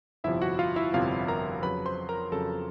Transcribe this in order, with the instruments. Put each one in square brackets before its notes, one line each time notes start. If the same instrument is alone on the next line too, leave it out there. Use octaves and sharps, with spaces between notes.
[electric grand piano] G1 F2 C3 F3 E4 E5
F#4 F#5
F4 F5
E4 E5
G1 F2 C3 F3 F4 F5
A#4 A#5
F2 C#3 F#3 B4 B5
C5 C6
A#4 A#5
F2 C#3 F#3 A4 A5